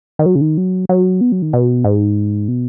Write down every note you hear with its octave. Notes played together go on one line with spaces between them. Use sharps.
D#3
F#3
C#3
D#3
F#3
F#3
B3
F#3
D#3
B2
G#2
B2